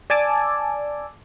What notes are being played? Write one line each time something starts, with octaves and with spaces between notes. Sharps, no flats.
D5 G#5 A5 D6 E6